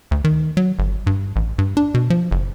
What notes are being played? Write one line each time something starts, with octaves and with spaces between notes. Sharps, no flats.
D2
D#3
F#3
G1
G2
A1
G2
D4
B2
F3
F#1